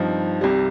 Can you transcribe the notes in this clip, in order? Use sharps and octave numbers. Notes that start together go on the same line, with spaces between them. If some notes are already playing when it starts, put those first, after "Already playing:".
Already playing: G2 F3 C4 D#4
C2 C3 G3